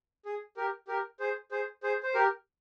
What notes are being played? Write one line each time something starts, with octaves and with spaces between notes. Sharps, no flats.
G#4
G4 A#4
G4 A#4
G#4 C5
G#4 C5
G#4 C5
C5
G4 A#4